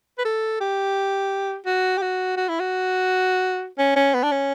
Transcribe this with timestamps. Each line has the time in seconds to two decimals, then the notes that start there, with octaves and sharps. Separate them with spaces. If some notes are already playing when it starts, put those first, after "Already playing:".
0.19 B4
0.25 A4
0.61 G4
1.66 F#4
1.98 G4
2.02 F#4
2.37 F#4
2.49 E4
2.60 F#4
3.79 C#4
3.96 C#4
4.14 B3
4.23 D4
4.31 C#4